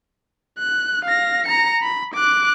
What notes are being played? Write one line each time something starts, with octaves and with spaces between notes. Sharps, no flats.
F#6
F5 A#6
A#5 C#7
B5
D6 F#6